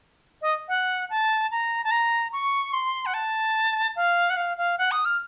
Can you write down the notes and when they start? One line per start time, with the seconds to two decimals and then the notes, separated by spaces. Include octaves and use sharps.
0.42 D#5
0.68 F#5
1.10 A5
1.51 A#5
1.84 A5
1.91 A#5
2.33 C#6
2.73 C6
3.06 F#5
3.14 A5
3.96 F5
4.30 F#5
4.37 F5
4.57 F5
4.78 F#5
4.91 D#6
5.05 F6